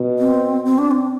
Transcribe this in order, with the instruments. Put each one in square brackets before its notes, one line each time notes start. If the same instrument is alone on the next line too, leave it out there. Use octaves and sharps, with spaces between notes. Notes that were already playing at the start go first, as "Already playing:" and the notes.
Already playing: [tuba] B2
[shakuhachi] C4
C4
D4
C4